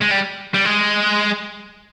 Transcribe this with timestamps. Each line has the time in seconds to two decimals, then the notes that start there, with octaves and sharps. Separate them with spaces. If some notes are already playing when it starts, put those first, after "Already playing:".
0.01 G#3
0.11 G3
0.54 G3
0.65 G#3